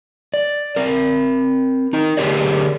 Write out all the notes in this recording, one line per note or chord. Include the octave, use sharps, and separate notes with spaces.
D5
C4 A#4
D#4 A#4
D3 G4 G#4 A#4 C#5 D5